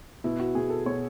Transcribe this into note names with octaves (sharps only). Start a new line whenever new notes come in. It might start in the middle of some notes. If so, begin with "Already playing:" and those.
B2 E4
F#4
B2 G#4
A4
B2 C#5